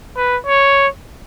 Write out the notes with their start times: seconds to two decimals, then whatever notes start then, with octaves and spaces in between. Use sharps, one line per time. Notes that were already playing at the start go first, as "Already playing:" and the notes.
0.16 B4
0.46 C#5